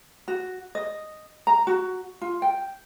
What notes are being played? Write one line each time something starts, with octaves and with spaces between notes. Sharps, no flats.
F#4
D#5
A#5
F#4
F4
G5